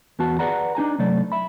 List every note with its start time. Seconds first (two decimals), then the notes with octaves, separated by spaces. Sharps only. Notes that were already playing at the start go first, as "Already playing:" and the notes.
0.19 E2 B3 F#4 A5
0.39 G#4 B4 D5 F#5 A#5
0.75 D4 D#4 G#5 A#5
0.99 C3 F#3 A3 D5
1.32 E5 B5